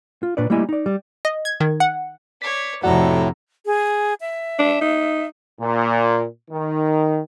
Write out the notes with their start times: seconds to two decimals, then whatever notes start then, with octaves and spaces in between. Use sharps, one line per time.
0.23 F4
0.37 A#2 D4 B4 C#5 D5
0.50 G3 A3 A#3 E4 D#5 G#5
0.69 D#4 D5
0.86 G3
1.25 D#5
1.45 G#6
1.60 D#3
1.80 F#5
2.42 C#5 D5 B6
2.83 F2 A2 C3 F#4 A4 D5 F#5 A#5
3.66 G#4
4.21 E5
4.59 D4
4.82 D#4
5.61 A#2
6.50 D#3